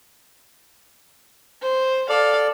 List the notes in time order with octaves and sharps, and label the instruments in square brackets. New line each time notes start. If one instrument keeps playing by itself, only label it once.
[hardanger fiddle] C5
[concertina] A4 D5 [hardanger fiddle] F5